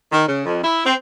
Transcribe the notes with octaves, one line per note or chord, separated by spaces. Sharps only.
D#3
C#3
F2
E4
C4